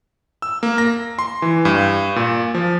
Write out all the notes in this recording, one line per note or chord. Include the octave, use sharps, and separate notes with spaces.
E6
A#3
A#6
C6
E3
G2
A#2
F3